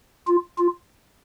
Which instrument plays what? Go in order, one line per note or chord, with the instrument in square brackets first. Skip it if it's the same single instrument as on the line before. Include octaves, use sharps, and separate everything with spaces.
[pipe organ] F4
F4